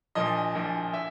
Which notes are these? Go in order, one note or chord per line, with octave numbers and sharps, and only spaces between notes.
A#1 A#2 F3 D#5
A#1 A#2 F3
E5